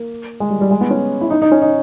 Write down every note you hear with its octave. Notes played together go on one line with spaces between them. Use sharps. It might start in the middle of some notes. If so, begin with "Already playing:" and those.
Already playing: A#3
G#3
G3
G3
G#3
B3
C#4
E4
D#4
D#4
C#4
D#4